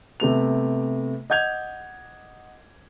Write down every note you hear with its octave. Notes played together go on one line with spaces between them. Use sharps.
C3 A3 B3 F7
D#5 F#5 G6 G#6 F7